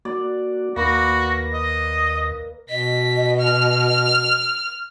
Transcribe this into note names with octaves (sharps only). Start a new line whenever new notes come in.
A#3 F#4 D5
D#2 A#3 F#4 B4 A#6
D#5
B2 D#5 B6
F6